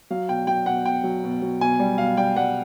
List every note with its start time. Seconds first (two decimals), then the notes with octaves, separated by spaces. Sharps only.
0.11 F#3 F5
0.28 B2 G5
0.47 F#3 G5
0.66 B2 F#5
0.85 B2 G5
1.04 F#3
1.24 B2
1.42 F#3
1.61 B2 G#5
1.79 G3
1.98 B2 F5
2.17 G3 G5
2.36 G3 F#5